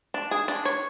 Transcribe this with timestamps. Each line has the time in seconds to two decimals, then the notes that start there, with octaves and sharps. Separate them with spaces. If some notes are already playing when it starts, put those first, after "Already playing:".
0.14 D4
0.31 G#4
0.48 D4
0.65 C#5